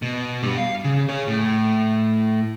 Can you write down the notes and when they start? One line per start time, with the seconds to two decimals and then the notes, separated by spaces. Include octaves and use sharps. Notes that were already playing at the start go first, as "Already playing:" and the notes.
0.02 B2
0.42 G2 G3
0.58 F5
0.84 C#3
1.09 G#4 C#5
1.27 A2